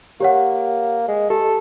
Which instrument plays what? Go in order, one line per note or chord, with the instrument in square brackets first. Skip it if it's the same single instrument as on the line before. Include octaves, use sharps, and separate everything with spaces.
[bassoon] A#3 [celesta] G4 C#5 F#5
[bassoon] G#3
[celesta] G4 [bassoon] A4